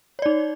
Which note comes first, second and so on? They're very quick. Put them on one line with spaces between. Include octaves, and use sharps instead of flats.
C#5 D5 D#4